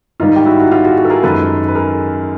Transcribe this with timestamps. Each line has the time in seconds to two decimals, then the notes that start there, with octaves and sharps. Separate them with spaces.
0.20 G#2 D#3 G3 D#4 F4
0.36 G4
0.45 E4 F#4
0.59 F#4
0.72 F4 G4
0.85 F#4 G#4
0.97 F#4 G#4
1.05 A4
1.10 G#4 A#4
1.23 F#2 D#3 G#3 A4 B4
1.68 B4
1.75 G#4 A#4